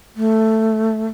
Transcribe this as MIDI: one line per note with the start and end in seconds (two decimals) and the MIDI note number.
0.16 1.07 57